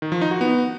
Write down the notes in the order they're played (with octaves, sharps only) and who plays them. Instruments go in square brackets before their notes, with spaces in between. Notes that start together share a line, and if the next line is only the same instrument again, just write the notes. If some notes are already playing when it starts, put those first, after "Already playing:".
[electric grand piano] D#3
F3
D#4
F#4
B3